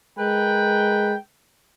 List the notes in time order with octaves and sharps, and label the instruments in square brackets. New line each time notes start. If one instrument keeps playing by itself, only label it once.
[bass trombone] G#3 [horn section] A#4 B4 G5